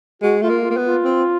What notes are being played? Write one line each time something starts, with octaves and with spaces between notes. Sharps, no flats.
G#3 F#4
A3 F4
A#3
F4
A#3
B3
F4
C4